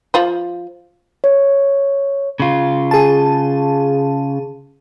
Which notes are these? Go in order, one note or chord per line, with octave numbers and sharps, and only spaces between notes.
F3 F4 C5
C#5
C#3 F4
G#4 A5